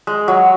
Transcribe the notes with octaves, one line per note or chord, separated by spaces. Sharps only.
G#3
F#3